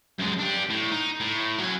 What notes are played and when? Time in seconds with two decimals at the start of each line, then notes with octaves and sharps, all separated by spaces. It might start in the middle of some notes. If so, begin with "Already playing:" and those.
0.18 F#2 G#3
0.39 D4 G4
0.70 A2
0.91 D#4
1.20 A2
1.59 F#3 G#5